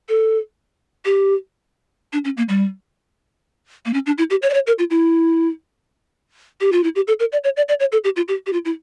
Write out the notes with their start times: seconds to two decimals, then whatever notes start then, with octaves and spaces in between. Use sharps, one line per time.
0.09 A4
1.05 G4
2.13 D4
2.25 C#4
2.37 A#3
2.49 G3
3.86 A#3
3.94 C#4
4.06 D4
4.18 E4
4.30 G4
4.42 C#5
4.50 D5
4.54 C#5
4.67 A#4
4.79 F4
4.90 E4
6.61 G4
6.72 F4
6.84 E4
6.96 G4
7.08 A4
7.20 A#4
7.32 D5
7.44 C#5
7.57 D5
7.69 D5
7.80 C#5
7.92 A4
8.04 G4
8.16 F4
8.28 G4
8.47 G4
8.53 F4
8.65 E4